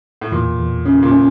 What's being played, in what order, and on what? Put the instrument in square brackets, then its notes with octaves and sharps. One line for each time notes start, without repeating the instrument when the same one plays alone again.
[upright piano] A2
[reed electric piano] E2 [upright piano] A#2
[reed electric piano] E2
[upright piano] C#3 [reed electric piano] C#4
[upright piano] A#2
[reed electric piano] C#4